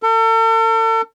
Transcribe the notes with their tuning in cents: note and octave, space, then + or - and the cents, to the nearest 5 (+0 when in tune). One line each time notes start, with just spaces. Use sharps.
A4 +40